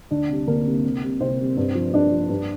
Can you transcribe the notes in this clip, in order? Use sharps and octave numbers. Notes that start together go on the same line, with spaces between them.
D2 D4
C3 G3
D2 A#3 A#4
C3 G3
C2
C3 G3
C2 C4 C5
C3 G3
G2
F3
G2 D4 D5
F3
G2